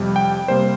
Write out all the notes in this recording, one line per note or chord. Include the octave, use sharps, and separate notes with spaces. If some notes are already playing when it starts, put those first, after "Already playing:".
Already playing: F2 C3 G3
G5
C3 G3 A#3 C5